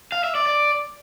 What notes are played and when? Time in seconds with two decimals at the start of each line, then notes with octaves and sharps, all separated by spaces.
0.12 F5
0.24 E5
0.35 D5
0.46 D5